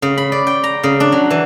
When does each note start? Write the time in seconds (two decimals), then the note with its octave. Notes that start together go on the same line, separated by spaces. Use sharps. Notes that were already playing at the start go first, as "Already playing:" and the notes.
0.02 C#3
0.18 B5
0.32 D5
0.47 G5
0.64 A#5
0.83 C#3
1.00 D4
1.12 F#3
1.31 E3